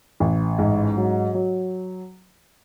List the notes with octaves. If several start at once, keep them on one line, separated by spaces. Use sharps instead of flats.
A1
G#2
F#3
F#3